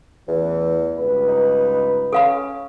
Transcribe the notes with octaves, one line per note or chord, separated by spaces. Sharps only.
A1 E2 E3
C#2 G2 B4
D#4
C#4 A4 F5 B5